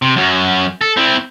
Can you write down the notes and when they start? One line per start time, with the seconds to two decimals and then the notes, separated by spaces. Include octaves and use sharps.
0.02 C3
0.16 F#2 F#3
0.81 A4
0.97 C4 E4